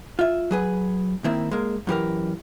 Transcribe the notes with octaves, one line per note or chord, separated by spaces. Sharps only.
F4 E5
F#3 G#4 B4
D#3 A#3 C4 E4
G#3 A#3
F#2 E3 G4 A#4